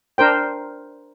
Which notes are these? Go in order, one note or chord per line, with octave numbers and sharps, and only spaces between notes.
D4 A#4 C5 G5